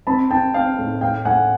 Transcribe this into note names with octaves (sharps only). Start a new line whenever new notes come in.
C4 A5 B5
C4 G5 A5
C4 F5 G5
A2
A2 F5 G5
A2 F#5 G#5